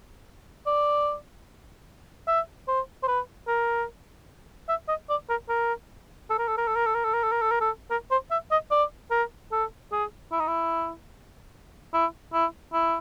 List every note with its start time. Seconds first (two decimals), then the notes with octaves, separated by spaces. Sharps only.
0.66 D5
2.27 E5
2.68 C5
3.03 C5
3.08 B4
3.48 A#4
4.69 E5
4.88 D#5
5.09 D5
5.29 A#4
5.49 A#4
6.30 A4
6.39 A#4
6.48 A4
6.58 A#4
6.67 A4
6.76 A#4
6.86 A4
6.95 A#4
7.04 A4
7.13 A#4
7.23 A4
7.32 A#4
7.42 A4
7.51 A#4
7.61 A4
7.91 A#4
8.11 C5
8.31 E5
8.51 D#5
8.71 D5
9.11 A#4
9.52 A4
9.92 G#4
10.32 E4
10.40 D#4
10.47 E4
11.93 E4
12.33 E4
12.73 E4